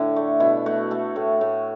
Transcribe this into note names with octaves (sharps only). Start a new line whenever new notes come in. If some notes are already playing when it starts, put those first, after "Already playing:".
Already playing: A2 D3 D4 E4
A3
B2 E4
A3 F#4
A3 A4
A2
A2